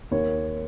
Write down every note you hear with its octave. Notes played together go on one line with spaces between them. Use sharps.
D#2 C#5